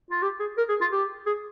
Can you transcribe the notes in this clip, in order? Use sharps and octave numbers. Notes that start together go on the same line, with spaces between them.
F4
G4
G#4
A#4
G#4
F4
G4
G#4